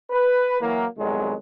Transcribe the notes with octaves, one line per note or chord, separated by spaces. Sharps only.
B4
E3 F#3 A#3
C2 F2 B2 D#3 F#3 G#3